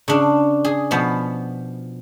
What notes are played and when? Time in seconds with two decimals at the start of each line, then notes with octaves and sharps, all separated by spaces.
0.08 C#3 D4
0.65 G#4
0.91 B2 F3 B3